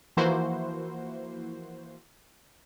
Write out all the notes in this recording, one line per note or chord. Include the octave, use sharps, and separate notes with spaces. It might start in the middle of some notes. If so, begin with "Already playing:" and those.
E3 F3 A#3 E4 F#4 C5